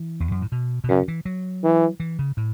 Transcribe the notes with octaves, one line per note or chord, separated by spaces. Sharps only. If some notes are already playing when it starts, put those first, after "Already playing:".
Already playing: E3
E2
F#2
A2
B2
B2
F#2 C#3
E3
F#3
E3
E3
C#3
A2